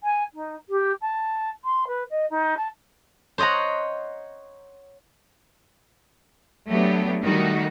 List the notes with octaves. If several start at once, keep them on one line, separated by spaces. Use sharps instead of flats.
G#5
D#4
G4
A5
C6
B4
D#5
D#4
A5
C5 C#5 D#5 F#5 A#5
F#3 A3 B3 D4 G4
D#3 G3 A3 D#4 F#4